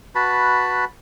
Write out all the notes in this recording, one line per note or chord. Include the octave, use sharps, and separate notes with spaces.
F#4 B4 A5 B5